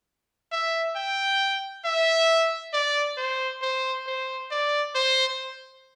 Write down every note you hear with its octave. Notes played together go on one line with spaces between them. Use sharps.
E5
G5
E5
D5
C5
C5
C5
D5
C5